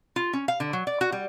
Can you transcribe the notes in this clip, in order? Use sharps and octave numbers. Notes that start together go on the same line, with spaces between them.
F4
C#4
F5
D3
F#3
D5
F#4
G3